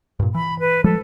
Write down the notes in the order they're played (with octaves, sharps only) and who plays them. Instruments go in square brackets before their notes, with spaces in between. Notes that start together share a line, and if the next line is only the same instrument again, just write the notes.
[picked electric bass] G2 A#2
[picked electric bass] E3 [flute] B5
[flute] B4
[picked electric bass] F3 G3 G#3 [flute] A4